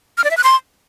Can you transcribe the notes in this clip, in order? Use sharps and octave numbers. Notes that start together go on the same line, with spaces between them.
F6
D5
E5
F#6
C6